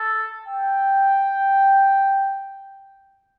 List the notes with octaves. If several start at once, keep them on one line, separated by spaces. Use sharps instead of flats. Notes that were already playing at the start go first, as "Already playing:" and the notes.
Already playing: A4
G5